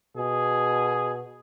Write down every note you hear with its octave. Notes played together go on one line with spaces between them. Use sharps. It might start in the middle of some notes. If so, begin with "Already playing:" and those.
B2 G#4